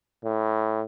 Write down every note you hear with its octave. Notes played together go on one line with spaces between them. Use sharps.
A2